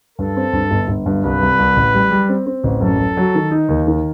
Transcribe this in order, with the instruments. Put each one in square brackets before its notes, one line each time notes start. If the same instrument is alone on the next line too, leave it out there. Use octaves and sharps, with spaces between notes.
[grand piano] G2 [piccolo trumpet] A4
[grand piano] C4
G2
G1
G1
G2
[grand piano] C2 [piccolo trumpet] B4
[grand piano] C2
C2
A1
G3
G3
C4
C4
A1
[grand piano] F#2 [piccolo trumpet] A4
[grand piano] F#2
F#3
D#3
D#4
D#2
D#3